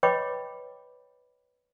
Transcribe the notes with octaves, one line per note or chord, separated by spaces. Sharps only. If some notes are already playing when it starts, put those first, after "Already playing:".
B4 C#5 D#5 G5 B5 D6